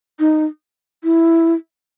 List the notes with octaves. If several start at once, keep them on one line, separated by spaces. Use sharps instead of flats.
D#4
E4